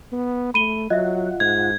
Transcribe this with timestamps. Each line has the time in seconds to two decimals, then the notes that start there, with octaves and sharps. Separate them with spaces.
0.12 B3
0.54 A3 B5 D#7 G7
0.90 F#3 F4 D#5 E5 F#5
1.40 G#2 G#6